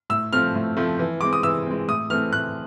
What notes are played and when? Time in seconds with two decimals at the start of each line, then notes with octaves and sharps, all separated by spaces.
0.10 A2 E6
0.33 F3 A3 C4 F6
0.55 A2
0.77 F3 A3 C4
0.99 E3
1.21 G#3 C4 D6
1.33 D#6
1.43 E3 E6
1.66 G#3 C4
1.88 A2 D#6
2.10 E3 A3 C4 F6
2.33 A2 F#6